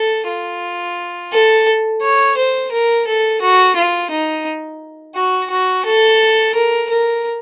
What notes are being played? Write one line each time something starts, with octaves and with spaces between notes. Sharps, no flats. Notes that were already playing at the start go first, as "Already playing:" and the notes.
Already playing: A4
F4
A4
C#5
C5
A#4
A4
F#4
F4
D#4
F#4
F#4
A4
A#4
A#4